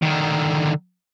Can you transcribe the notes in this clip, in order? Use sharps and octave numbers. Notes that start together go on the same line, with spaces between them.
D3 D#3